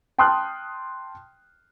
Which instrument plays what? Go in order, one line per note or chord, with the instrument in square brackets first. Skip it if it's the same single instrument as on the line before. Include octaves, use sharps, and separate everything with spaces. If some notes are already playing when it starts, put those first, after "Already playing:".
[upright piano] G5 A5 C6 D#6 F6 F#6